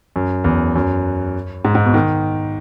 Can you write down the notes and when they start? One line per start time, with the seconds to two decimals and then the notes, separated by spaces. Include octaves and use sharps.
0.16 F#2
0.44 E2
0.76 F#2
1.65 G#2
1.75 G#2
1.85 B2
1.94 D#3